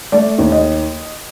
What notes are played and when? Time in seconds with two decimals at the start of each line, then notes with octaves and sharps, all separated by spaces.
0.12 A3 D5
0.39 D#2
0.52 D#5